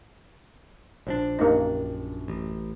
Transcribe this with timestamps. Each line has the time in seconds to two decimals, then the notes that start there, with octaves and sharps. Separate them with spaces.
1.07 A#1 F3 D4 C5
1.39 F#2 A#3 D#4 G4
2.28 A1